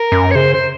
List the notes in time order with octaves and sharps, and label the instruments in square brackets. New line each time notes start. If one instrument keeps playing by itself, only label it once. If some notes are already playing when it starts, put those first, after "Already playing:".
Already playing: [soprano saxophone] A#4
[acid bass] F#2
[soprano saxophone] C#5
[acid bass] C#3 [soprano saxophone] C5
[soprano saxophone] C5